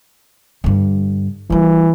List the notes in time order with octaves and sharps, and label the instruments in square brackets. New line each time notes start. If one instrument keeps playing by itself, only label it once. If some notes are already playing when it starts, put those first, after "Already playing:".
[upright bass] G2 D3
[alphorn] E3 [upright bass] G3 A#3